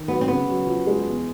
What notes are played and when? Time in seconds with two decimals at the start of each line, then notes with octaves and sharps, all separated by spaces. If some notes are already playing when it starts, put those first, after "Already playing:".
Already playing: D#3
0.08 F#3 B3
0.21 C4
0.27 C#3 B3
0.48 F#3
0.67 F3
0.87 G#3
1.06 E2